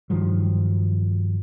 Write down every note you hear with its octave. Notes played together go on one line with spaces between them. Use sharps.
G2 D#3 F3 F#3